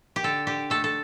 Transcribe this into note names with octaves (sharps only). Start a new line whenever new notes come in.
G4
D3 A4
D3 G4
A3 A4
A4